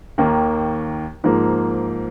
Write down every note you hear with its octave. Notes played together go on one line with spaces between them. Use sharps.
D#2 D#3 A#3
G#2 F3 A#3